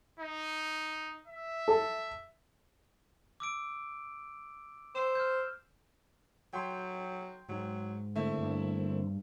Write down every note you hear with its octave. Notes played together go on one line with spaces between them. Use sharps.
D#4
E5
A4
D6 E6 D7
C5 E6 E7
F6 G6
F#3 G5 C6
G#2 F#3
D3 A3 A#3 C4 E4 E5
G2